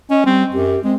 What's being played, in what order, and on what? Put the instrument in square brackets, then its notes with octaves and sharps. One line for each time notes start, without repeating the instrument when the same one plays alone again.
[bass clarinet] C#4 [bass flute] D#5
[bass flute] G3 [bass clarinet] C4
[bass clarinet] F#2 [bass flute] G4
[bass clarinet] G#3 [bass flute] C4